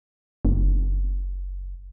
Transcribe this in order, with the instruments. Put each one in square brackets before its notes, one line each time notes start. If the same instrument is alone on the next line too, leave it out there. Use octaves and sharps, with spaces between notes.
[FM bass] F#1